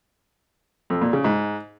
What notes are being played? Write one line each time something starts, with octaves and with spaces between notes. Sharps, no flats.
F2
A#2
C#3
G#2